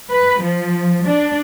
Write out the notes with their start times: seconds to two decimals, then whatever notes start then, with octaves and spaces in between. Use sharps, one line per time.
0.12 B4
0.41 F3
1.05 D4